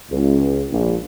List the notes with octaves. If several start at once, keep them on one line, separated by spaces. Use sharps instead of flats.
C#2
A#1